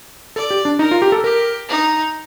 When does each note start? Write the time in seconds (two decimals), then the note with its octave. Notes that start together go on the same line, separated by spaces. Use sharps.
0.36 A4 D5
0.50 G4
0.65 D4
0.79 D#4 A#4
0.91 F4
1.02 G4
1.12 A4
1.24 G4 A#4
1.68 D#4